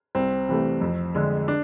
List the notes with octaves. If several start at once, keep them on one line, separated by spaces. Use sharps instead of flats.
C2 C4
C3 E3 A3
F2
D3 G#3
D4